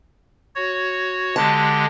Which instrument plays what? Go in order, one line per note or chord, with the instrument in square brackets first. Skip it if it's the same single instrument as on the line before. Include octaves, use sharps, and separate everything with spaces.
[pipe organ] F#4 C#5
[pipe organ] D3 G#3 G4 [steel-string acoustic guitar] A5